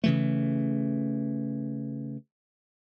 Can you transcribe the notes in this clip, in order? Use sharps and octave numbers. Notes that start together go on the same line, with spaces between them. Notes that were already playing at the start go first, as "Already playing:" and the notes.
C#3 E3 A3